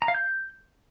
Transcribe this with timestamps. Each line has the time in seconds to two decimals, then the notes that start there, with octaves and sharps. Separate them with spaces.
0.02 A#5
0.08 F5
0.15 G6